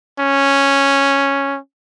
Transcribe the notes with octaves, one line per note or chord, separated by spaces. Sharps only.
C#4